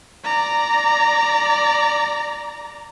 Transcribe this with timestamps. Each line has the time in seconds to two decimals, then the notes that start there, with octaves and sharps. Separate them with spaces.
0.24 D5 A#5